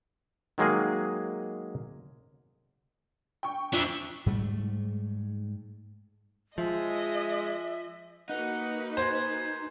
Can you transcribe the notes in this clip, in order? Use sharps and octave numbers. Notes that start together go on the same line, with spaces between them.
D#3 F#3 G#3 A#3 G#4
G5 C#6
F2 D4 E5
G#2 G3 A3
F3 G#3 D#5 E5
A#3 D#4 F#4 B4 F#5
C5 G#5